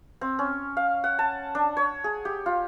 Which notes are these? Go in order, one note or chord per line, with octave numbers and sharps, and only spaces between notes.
C4
C#4
F5
F#5
A5
D4
C#5
G#4
G4
F4